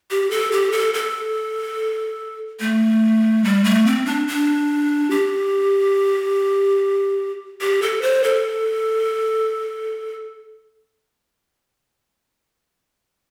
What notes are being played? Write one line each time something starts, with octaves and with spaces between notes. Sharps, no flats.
G4
A4
G4
A4
A4
A3
G3
A3
C4
D4
D4
G4
G4
A4
C5
A4